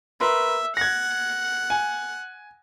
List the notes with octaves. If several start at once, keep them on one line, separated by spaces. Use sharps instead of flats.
A#4 B4 E5 C6
F#5 G#6 A#6
G#5